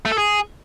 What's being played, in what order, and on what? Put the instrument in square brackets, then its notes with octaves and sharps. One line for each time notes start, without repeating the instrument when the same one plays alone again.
[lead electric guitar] A3
A4
G#4